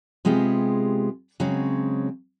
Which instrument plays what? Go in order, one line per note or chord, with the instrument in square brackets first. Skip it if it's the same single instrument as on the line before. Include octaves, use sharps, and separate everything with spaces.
[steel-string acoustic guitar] C3 G#3 B3 F4 G4 G#4
C#3 F#3 G#3 C4